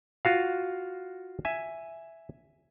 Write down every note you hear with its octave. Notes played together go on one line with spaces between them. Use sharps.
F4 F#4 F5
E5 G#5